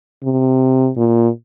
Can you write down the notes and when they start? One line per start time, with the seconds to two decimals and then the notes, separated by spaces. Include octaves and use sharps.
0.24 C3
0.97 A#2